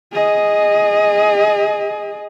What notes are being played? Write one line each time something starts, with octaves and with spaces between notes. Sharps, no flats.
G#4 D#5